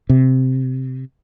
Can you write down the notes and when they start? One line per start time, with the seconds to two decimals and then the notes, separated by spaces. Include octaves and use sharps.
0.09 C3